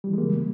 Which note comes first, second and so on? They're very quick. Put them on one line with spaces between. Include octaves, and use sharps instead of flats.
G3 E3 G#3 A#3 C#3